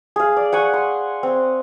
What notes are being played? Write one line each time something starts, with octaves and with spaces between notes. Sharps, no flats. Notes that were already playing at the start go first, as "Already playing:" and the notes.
G#4 F5
D5
F#5 G#5 C#6
C6
C4